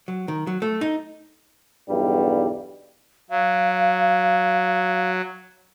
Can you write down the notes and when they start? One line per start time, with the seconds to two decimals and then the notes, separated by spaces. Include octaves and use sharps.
0.08 F#3
0.28 D#3
0.47 F#3
0.62 A3
0.81 D#4
1.89 B1 E2 G2 G3
3.30 F#3 F5